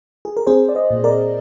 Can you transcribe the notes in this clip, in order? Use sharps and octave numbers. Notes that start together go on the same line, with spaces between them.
G#4
A#4
C4 G#4 C5
D5
C5 D#5
A#2
A#4 D5